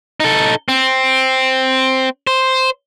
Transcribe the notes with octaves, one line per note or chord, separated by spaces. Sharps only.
D#4 A4
C4
C5